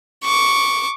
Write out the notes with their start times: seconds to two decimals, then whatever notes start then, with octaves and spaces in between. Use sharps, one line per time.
0.23 C#6 D6